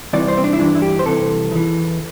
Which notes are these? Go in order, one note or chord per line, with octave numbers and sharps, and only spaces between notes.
C2 C3 E3 D5
C5
C4
D4
E4
G2 E3 D4
E4
G4
C5
C2 C3 E3 A4
E2 E3